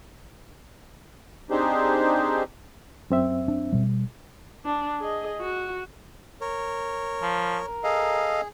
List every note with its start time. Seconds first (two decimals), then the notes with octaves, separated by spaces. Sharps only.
1.51 C4 D4 D#4 G4 G#4 C5
3.10 F#2 C4 E5
3.48 D4
3.73 B2 G3
4.65 D4
5.00 G#4 D#5
5.41 F#4
6.41 A#4 C#5
7.22 F3
7.67 A#4
7.84 G#4 A4 D#5 F5